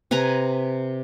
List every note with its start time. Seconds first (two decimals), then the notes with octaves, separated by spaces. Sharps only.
0.11 C3 B4 G#5 A#5